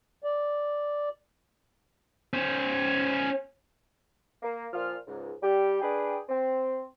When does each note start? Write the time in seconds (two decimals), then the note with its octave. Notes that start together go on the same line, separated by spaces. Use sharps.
0.24 D5
2.34 C#4 C5
4.43 A#3
4.73 A#2 F3 F4 F6
5.07 C#2 G#2
5.42 G3 G4
5.82 D4 G#4 B4 G5
6.29 C4